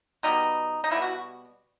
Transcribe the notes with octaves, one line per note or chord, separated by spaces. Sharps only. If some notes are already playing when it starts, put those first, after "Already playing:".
B2 G3 B3 D#4
D#4
B2 G3 B3 E4
F#4